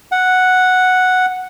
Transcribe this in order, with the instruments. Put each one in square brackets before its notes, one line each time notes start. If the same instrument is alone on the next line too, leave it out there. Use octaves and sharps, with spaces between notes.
[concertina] F#5